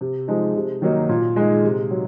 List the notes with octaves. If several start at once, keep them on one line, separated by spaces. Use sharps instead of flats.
C3
F3 G#3 D#4
C3
D#3 F#3 A#3 D#4
A#2
G#3 D#4
C3
F#3